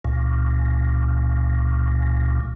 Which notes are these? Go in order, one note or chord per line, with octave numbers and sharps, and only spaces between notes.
C#2 A#2